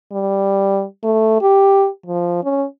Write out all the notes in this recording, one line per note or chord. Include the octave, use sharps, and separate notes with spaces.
G3
A3
G4
F3
C#4